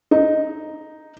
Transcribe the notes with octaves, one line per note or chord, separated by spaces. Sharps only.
D#4